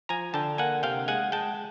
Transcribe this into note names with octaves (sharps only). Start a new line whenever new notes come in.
F3 G#5 A#5
D3 G5 A5
A#3 F#5 G#5
C3 F5 G5
G#3 F#5 G#5
G#3 G5 A5